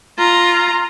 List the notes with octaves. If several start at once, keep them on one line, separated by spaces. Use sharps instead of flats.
F4 A#5